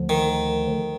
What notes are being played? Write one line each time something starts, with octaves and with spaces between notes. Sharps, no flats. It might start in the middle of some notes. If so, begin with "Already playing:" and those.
Already playing: D2 D3 F3
D#3